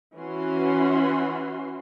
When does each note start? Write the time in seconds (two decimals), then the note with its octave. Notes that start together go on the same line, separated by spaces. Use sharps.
0.16 E3 C#4 F#4 C6